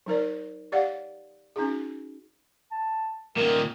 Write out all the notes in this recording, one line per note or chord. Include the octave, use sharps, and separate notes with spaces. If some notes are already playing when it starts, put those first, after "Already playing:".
F#3 D#4 A#4 D5
G4 C#5 D5 F5 F#5
C#4 D#4 F#4 G#4
A5
A#2 D#3 A#4